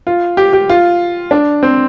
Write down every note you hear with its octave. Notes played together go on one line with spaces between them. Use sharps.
F4
G4
G4
F4
D4
C4